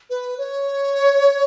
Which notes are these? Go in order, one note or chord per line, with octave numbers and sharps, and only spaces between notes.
B4
C#5